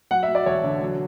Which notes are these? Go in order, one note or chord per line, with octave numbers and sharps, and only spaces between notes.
F#3 F#5
E5
F#3
D5
E1 C#5
D3
F#3